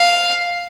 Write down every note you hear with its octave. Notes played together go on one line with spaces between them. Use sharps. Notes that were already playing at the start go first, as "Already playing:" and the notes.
Already playing: F5